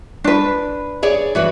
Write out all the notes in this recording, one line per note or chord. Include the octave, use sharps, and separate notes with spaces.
D4 B4
G#4 C#5 D5
E3 F#4 B4